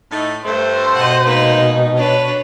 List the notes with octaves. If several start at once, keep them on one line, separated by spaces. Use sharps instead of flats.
A2 A3 D#4
G2 A3 C5
B2 D#5 F#5
G#2 A#3 D#4 B4
D4 B4 C#5